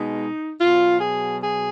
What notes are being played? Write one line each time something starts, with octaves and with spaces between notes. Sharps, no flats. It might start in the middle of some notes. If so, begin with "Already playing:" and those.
Already playing: B2 G#3 D#4
B2 F#3 F4
G#4
G#4